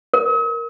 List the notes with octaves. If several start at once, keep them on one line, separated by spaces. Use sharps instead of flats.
A#4